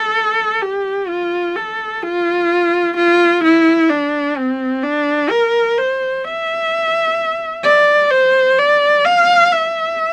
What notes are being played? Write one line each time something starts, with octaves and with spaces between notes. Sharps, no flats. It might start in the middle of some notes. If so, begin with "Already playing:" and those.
Already playing: A4
G4
F4
A4
F4
F4
E4
D4
C4
D4
A#4
C5
E5
D5
C5
D5
F5
E5